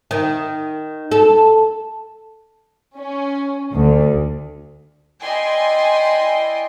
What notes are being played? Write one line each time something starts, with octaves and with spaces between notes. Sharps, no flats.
D#3
A4
C#4
D2
E4 D5 D#5 G5 G#5 C6